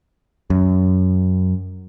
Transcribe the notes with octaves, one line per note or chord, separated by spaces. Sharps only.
F#2